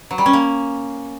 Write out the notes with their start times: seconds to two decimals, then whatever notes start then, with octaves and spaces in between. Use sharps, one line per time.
0.11 F#3
0.18 G3
0.26 C#4
0.33 A#3